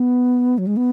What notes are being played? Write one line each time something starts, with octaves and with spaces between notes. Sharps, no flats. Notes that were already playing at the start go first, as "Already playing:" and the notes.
Already playing: B3
F#3
G#3
B3